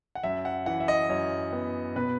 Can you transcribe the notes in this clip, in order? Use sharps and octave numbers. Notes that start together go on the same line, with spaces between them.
F#5
F#2 E5
F#5
E3 F#5
E5
D#5
F#2 C#5
B3
B2 B4